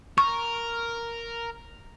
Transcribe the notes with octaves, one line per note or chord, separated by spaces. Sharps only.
A#4 C#6